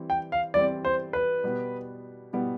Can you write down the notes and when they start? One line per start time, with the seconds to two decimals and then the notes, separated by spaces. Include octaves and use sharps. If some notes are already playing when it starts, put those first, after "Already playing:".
Already playing: E3 G3 C4
0.10 G5
0.32 F5
0.54 E3 G3 C4 D5
0.85 C5
1.13 B4
1.44 B2 G3 B3
2.33 B2 G3 B3